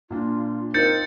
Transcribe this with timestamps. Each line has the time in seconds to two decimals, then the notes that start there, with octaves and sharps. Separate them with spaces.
0.10 A#2 A#3 D4 F4
0.74 C4 D#4 F4 A#4 G6 A6 C#7